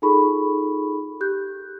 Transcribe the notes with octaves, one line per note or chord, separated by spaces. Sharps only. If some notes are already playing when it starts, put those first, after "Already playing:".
D#4 F4 G#4 A4 B5 C#6
G4 F#6 G6